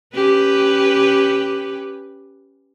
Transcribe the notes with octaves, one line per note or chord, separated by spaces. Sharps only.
C#4 G4 B4